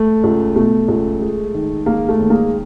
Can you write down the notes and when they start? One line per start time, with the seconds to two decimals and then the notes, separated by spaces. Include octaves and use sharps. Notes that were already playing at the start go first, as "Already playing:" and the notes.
Already playing: A3
0.23 C#2
0.56 B2 A3
0.88 C#2
1.21 G#3
1.54 D#3
1.86 G#3 A#3
2.08 A3
2.19 D#2
2.30 G#3 A#3